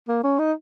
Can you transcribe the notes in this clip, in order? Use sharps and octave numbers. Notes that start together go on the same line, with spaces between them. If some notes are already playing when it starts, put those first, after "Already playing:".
A#3
C#4
D#4